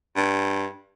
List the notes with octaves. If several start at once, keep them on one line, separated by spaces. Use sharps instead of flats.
G2